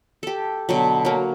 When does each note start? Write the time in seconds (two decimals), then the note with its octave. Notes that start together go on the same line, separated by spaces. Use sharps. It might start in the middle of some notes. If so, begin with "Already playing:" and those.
0.23 G4 A4
0.69 B2 D3 F#3
1.05 F#3 A#3